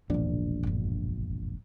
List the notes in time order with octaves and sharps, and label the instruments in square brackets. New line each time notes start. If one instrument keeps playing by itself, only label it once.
[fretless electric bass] E1 A#1 D4 [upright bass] D#2 G#2
[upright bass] G1 F2